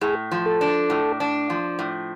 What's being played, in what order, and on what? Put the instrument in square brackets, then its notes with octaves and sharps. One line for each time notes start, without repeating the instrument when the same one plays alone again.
[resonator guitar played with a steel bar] A2 [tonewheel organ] G#4
[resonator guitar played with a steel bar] F3
[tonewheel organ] A4
[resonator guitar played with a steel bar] D4
A2
D4
F3
A2